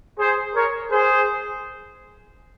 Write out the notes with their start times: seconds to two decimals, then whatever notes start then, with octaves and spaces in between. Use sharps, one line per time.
0.19 G#4 C5
0.54 A#4 C#5
0.89 G#4 C5